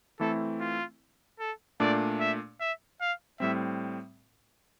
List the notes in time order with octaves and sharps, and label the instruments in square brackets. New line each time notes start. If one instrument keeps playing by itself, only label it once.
[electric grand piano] E3 A3 C4 E4 [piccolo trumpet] A4
[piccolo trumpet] F4
A4
[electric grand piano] A#2 A3 D4 [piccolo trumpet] D5
[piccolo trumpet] E5
E5
F5
[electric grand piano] A2 G3 C4 [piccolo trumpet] E5